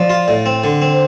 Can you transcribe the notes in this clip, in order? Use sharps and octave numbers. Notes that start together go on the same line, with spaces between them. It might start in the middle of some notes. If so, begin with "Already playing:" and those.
Already playing: F3 D5
F4
A2
C4
D3
C4
C5